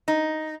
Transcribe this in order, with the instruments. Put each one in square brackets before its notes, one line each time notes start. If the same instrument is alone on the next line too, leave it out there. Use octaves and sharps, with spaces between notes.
[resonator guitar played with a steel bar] D#4